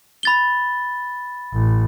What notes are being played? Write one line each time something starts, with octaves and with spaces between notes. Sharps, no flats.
B5 A6 G7
A1